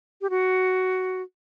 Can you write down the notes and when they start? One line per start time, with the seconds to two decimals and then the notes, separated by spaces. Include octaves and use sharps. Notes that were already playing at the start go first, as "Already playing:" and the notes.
0.21 G4
0.30 F#4